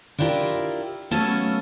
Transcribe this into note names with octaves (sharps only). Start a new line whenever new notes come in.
D4 E4 F4 G4 A#4
F#3 A3 B3 C#4 A4 F5